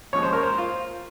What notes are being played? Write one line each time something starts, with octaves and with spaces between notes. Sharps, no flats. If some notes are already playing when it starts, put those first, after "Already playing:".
D#2 C#3 F3 G#3 C#5
C5
A#4
C5
F4